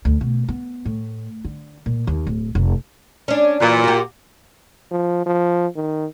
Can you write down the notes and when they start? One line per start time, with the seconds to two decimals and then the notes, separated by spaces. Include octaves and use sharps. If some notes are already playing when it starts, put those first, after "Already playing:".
0.05 D2
0.21 B2
0.49 B3
0.85 A2
1.45 D3
1.86 A#2
2.07 D#2
2.27 D1
2.55 F1
3.28 C#4 D4
3.60 A#2 E3 F#3
3.84 F#4 G4
4.91 F3
5.26 F3
5.76 D#3